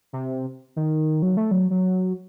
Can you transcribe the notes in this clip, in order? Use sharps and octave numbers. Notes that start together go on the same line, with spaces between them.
C3
D#3
F#3
A3
F#3
F#3